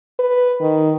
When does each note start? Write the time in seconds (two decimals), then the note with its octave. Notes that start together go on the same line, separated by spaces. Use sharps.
0.19 B4
0.61 D#3